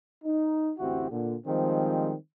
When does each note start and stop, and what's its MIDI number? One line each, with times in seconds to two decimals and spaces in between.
0.24 0.71 63
0.79 1.10 33
0.79 1.10 38
0.79 1.10 60
0.79 1.10 64
0.79 1.10 66
0.79 1.10 67
1.10 1.35 46
1.10 1.35 50
1.46 2.13 51
1.46 2.13 53
1.46 2.13 55
1.46 2.13 56
1.46 2.13 60